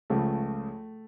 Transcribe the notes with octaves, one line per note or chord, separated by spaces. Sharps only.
C#2 C#3 F3 A3